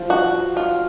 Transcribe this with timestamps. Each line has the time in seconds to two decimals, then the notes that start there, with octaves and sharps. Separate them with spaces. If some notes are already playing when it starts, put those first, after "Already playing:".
Already playing: F3
0.10 F#4
0.57 F4